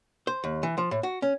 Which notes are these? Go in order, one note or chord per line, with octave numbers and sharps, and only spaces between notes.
C5
D#2
E3
F3
A2
F#4
C#4